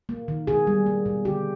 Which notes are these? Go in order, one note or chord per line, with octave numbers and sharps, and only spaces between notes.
A#3
D#3
B2 G#4
G3
A#3
B2
D3 G4